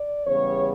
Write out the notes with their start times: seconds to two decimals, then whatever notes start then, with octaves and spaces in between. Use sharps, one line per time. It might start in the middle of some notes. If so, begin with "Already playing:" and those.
Already playing: D5
0.27 E2 C#3 G3 B3 C#5